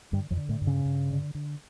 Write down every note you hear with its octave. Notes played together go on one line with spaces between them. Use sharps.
G2 D3 G3
F2 F3
D3
A2 A3
G2
C#3 C#4
G2
D3
D3